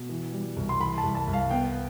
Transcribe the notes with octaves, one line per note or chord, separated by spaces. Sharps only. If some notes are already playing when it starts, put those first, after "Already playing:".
Already playing: B2
E3
G3
C2
C6
E3 B5
A5
C2
A5
C2
F5
B3 G5